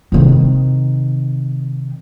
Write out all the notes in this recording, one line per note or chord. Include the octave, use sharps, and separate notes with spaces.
C3 D#3